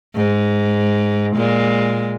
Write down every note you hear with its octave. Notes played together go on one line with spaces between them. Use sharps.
G#2
A#2 G#3